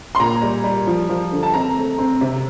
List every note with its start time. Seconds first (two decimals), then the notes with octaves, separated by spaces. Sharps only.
0.15 C6
0.20 A#2 A#5
0.42 G3
0.64 G3
0.87 F3
1.09 F3
1.32 D3
1.43 A5
1.54 C4 A#5
1.76 A3
1.99 C4
2.21 C3